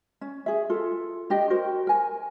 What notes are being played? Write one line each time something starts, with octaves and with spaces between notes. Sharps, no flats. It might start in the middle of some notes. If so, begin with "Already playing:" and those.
C#4
G#4 E5
F4 A4
D4 G4 D#5 G5
F#4 A#4 C5
A#4 G#5